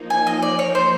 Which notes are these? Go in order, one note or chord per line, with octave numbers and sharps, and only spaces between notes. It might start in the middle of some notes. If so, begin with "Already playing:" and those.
Already playing: F3 A#3 D#4
G#5
D#5
D5
C#5
C5